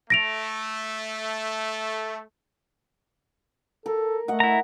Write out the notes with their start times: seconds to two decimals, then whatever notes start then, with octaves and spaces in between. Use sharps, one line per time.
0.10 A3 A#6 D7 F7
3.86 A4 A#4
4.28 A3 D#5 F#5
4.40 E4 A#5